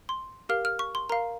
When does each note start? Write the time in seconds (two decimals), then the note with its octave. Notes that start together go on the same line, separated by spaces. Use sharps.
0.09 C6
0.49 G4 A#4 F5 F6
0.65 F6
0.79 C#6
0.95 C6
1.09 A#4 F5 A#5